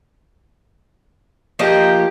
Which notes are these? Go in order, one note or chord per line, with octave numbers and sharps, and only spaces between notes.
F3 A#3 G4 D#5